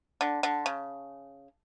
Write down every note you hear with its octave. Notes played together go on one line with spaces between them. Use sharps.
D3
D3
C#3